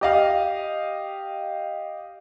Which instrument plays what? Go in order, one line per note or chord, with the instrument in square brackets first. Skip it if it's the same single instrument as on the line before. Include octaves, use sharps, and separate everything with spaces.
[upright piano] G4 D#5 F5